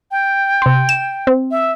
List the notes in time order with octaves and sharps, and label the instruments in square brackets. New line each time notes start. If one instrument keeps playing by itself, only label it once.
[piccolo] G5
[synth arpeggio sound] C3 C6
E7
C4
[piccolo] E5